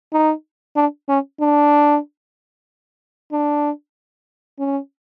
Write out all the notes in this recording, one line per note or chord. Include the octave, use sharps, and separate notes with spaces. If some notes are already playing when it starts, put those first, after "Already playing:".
D#4
D4
C#4
D4
D4
C#4